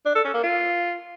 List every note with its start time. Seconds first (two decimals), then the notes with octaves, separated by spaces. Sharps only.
0.05 D4
0.15 A4
0.24 C#4
0.34 A#3
0.44 F4